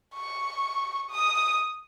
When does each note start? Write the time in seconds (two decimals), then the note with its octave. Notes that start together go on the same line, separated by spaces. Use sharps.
0.15 C#6
1.10 D#6